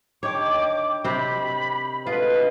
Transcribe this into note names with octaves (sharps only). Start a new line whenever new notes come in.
D3 D#3 G4 C#5 D6
C3 C4 C#5 B5
D2 D3 G#3 F4 B4 D#5